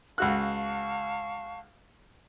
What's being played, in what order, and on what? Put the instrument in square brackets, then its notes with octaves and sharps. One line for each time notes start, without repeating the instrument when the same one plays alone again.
[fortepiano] C#2 F#4 F#6 [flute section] F5 A5 C#6